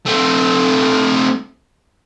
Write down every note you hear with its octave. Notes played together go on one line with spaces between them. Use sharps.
A3 C4